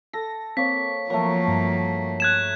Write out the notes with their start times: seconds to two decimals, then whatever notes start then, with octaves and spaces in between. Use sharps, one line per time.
0.13 A4 A#6
0.57 A#3 C4 C#5 B6
1.10 F3 F#3 A3 A#3 A#4
1.48 G2
2.20 F#6 G#6 E7